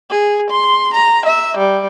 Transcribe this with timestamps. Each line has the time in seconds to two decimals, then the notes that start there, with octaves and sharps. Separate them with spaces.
0.10 G#4
0.51 C6
0.94 A#5
1.26 E5
1.58 G3